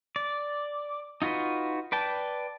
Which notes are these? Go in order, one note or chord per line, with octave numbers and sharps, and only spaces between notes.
D5
D#4 F4 F#4 B4
B4 D5 G5 A5